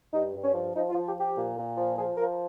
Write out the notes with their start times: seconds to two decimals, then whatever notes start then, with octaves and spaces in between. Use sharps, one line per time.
0.13 G2 D#4
0.34 G2
0.44 C#4
0.54 F3
0.75 F3 D#4
0.90 F4
0.95 F3
1.05 G4
1.16 F3 G4
1.35 A#2
1.56 A#2
1.77 F3
1.97 F3 G#4
2.17 F3 A#4